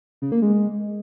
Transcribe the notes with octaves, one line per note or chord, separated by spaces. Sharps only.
C#3
A#3
G#3